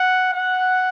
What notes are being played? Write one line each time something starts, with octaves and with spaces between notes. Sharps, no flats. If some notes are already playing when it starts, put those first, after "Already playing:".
Already playing: F#5
F#5